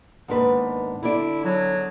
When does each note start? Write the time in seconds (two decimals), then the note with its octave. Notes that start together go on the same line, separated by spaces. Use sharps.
0.28 D#2 G#2 B3 D4 B4
1.03 D3 D4 E4 D5
1.44 F#3 G#4 A4